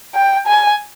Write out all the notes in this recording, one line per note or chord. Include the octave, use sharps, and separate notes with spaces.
G5
G#5